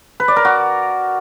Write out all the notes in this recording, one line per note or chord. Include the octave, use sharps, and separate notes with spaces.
B4
D5
A#4
F#4